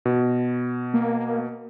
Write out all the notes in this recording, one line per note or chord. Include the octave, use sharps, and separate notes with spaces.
B2
A#3